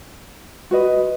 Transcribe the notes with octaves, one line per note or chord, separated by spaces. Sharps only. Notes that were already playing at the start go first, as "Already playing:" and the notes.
F#4 B4 D#5